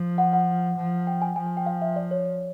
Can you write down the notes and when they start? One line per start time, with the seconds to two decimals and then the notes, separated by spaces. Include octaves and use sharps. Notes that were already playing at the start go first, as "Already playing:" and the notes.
Already playing: F3
0.18 F#5
0.33 F#5
0.77 F3
1.07 G5
1.22 G#5
1.36 F3 G#5
1.46 G#5
1.57 G5
1.66 F5
1.82 E5
1.96 D5
2.11 C#5